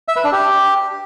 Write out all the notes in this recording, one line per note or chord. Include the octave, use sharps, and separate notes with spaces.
E5
B4
D4
G4